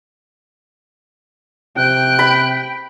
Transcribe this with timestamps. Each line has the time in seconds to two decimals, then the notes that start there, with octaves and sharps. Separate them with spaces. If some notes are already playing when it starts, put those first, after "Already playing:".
1.77 C3 G5 F#6
2.19 B5